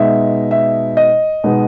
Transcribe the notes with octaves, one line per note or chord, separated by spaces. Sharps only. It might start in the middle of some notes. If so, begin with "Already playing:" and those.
Already playing: B2 G#3 B3 D#4 E5
E5
D#5
B2 G#3 B3 D#4